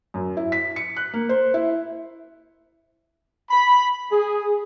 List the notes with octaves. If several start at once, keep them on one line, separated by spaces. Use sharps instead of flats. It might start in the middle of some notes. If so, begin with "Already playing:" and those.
F#2
E4
B6
C#7
F#6
A#3
C5
E4
B5
G#4